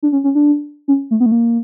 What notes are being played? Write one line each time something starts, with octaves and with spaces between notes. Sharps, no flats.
D4
C#4
C#4
D4
C#4
A3
B3
A3
A#3